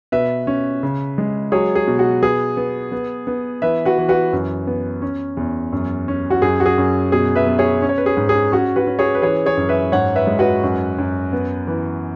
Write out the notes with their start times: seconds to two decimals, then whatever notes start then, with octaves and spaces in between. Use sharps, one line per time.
0.12 B2 B4 E5
0.47 C#4
0.83 C#3
1.18 G#3
1.52 F#3 G#4 C#5
1.75 G#4
1.87 B2
1.99 F#4
2.23 B3 G#4
2.57 B3
2.92 B3
3.27 B3
3.62 E3 B4 E5
3.85 F#4 B4
3.98 E3
4.09 F#4 B4
4.33 F#2
4.67 B3
5.02 C#4
5.37 E2
5.73 F#2
6.08 C#4
6.30 F#4
6.42 F#2 G#4
6.60 F#4
6.66 G#4
6.78 F#2
7.12 B2 G#4
7.35 B4 E5
7.47 B3
7.59 G#4 C#5
7.82 C#4
7.89 C#5
7.98 B4
8.06 G#4
8.17 G#2
8.29 G#4
8.52 C#4 F#4
8.76 F#4 B4
8.87 C#4
8.99 G#4 C#5
9.15 B4
9.22 E3 G#4 C#5
9.46 G#4 C#5
9.57 F#2
9.69 B4 E5
9.92 G#2 C#5 F#5
10.16 B4 E5
10.27 G#3
10.39 F#4 B4
10.63 F#2
10.98 F#2
11.33 B3
11.67 E3